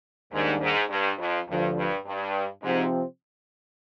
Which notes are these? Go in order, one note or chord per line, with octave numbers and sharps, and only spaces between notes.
D#2 G#2 D#3 G3 A#3 D4
G#2
G2
F2
D2 G2 D3 F3
G2
G2
G#2 C3 F3 C4